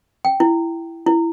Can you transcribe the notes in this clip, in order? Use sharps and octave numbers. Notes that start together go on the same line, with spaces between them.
G5
E4
E4